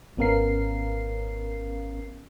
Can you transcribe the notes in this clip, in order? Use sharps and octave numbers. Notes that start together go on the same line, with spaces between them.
G#1 B3 C#4 A#4 F5 C7